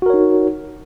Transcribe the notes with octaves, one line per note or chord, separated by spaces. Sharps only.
D#4 F#4 A#4 C#5